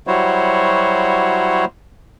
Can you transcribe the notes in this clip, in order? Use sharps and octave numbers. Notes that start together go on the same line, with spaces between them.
F#3 G3 E4 F#4 C5 C#5